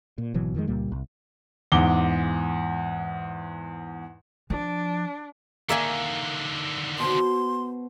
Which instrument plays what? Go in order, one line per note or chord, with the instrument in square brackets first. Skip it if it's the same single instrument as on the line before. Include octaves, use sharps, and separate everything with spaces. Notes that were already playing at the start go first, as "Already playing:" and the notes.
[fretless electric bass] A#2
G#1 B2 E3 F#3
F2 D#3 E3 G#3
C#2 A#2 G3 A#3
C2
[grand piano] E2 G#2 D6 G7
[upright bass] F3 [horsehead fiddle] D4
[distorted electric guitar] D3 D#3 [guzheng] A#3 E5 G#5
[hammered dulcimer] B2 C5 [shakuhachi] C6